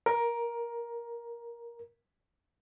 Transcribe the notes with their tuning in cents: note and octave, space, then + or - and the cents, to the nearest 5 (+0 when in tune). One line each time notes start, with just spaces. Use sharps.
A#4 +10